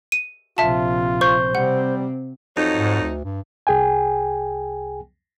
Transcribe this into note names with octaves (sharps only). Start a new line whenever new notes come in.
D#7
A#1 C3 F4 E5 A5
C5 C#6 G6
C3 G3 C4 F#5
F2 F#3 D#4
G#2
D2
G2
C2 G#4 G5 G#5